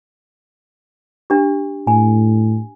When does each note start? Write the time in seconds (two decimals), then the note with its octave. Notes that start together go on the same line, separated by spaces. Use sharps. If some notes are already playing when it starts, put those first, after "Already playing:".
1.30 D4 G4
1.87 A2 G#5